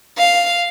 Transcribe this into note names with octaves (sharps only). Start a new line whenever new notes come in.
F5